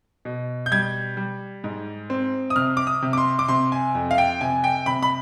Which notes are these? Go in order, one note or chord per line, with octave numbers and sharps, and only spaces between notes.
B2
G6
G3 G#6
G3
G#2
C4
D#6
C3 F6
D6
D#6
C3
D6
C6
D6
C3 C6
G#5
F2
F5
G5
C3 G#5
G5
C3 B5
B5